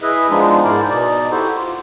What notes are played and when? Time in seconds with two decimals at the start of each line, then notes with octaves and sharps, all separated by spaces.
0.01 E4 G#4 B4 D#5 E5
0.30 F3 G#3 B3 D4 D#4 F4
0.63 G#2 G#3 E4 A#4 C5 D5
0.89 B2 D#4 D5
1.31 E4 F#4 G4 A4 C5
1.55 F4